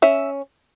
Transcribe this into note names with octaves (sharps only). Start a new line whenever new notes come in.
C#4 E5